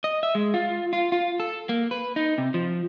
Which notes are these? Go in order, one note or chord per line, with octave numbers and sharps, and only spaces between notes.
D#5
E5
G#3
F4
F4
F4
A4
A#3
B4
D#4
C3
F3